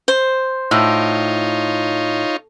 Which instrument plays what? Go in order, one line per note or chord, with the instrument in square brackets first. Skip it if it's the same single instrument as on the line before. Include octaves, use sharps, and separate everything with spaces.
[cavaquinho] C5
[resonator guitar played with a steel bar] A2 [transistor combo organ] D#4 F4 C#5